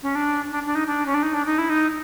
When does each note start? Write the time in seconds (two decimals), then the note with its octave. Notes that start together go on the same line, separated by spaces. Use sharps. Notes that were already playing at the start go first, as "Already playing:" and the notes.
0.03 C#4
0.15 D4
0.51 D4
0.66 D4
0.75 D#4
0.87 D4
1.06 C#4
1.14 D4
1.23 D#4
1.34 D4
1.46 D#4
1.58 E4
1.70 D#4